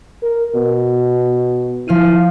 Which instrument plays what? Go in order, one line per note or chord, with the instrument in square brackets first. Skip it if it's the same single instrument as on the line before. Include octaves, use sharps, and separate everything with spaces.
[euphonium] A#4
B2
[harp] F3 F5 D#7 [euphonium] E4